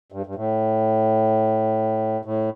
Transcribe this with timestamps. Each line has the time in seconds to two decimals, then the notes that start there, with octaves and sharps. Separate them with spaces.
0.12 G2
0.26 G2
0.35 A2
2.25 A2